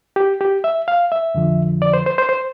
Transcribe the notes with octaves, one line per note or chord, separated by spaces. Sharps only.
G4
G4
E5
F5
E5
F2 D3 F3
D5
C5
C5
C5
C5